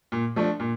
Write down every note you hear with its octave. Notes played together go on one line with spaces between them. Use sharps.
A#2
F3 A3 D4
A#2